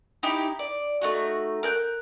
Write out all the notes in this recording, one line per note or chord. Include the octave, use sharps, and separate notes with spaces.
D#4 E4 G4
D5
A3 D#4 F#4
A#4 F#6 G6